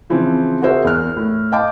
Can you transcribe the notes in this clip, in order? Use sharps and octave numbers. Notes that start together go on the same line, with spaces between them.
C#3 E3 F3 C4
F#4 G#4 A#4 C5 E5
E2 A#4 F6 F#6
A2
D#5 F5 G5 A5 D6